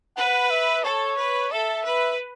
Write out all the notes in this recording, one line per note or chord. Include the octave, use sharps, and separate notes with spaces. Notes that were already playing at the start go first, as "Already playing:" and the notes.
B4 F#5
E5
A4 C#5
B4
A4 E5
B4